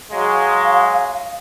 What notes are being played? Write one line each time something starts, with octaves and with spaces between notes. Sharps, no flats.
F#3 G#3 F5